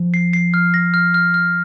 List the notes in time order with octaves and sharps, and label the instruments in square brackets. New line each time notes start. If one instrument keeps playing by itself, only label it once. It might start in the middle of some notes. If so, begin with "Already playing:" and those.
Already playing: [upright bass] F3
[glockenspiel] C7
C7
F6
A#6
F6
F6
F6